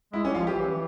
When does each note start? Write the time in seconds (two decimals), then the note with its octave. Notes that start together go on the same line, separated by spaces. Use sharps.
0.13 G#3 E4
0.24 G3 C#4
0.35 F3 F4
0.46 E3 G4
0.58 E3
0.68 E3